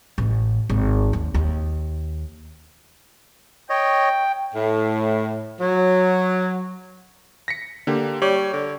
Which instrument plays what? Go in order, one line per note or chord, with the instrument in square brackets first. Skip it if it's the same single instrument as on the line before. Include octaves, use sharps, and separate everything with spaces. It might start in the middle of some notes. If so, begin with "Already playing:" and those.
[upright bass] A1
G#1
D#2
D#2
[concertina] C#5 D#5 [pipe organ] G5
[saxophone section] A2
F#3
[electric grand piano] A#6 B6 C#7
D3 A#3 G4
[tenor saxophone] G3 [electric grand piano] C#5
[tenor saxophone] D3